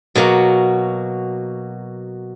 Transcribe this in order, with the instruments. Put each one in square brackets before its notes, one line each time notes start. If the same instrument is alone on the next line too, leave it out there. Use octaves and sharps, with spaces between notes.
[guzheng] B2 F#3 A#3